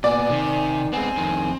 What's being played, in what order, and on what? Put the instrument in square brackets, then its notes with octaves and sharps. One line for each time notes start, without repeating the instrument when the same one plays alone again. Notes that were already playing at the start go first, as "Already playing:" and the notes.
[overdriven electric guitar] A#2 B3 [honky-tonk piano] D5 [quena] G#5
[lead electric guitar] C3 [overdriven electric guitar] D#3
[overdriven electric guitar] G#3 B3 [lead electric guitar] C4 [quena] G#5
[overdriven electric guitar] F2 D#3